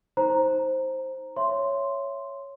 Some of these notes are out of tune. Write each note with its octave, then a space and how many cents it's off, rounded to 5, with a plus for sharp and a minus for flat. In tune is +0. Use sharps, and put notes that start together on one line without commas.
D#4 +30 C5 +10 A#5 +0
C#5 +0 E5 +20 C6 +0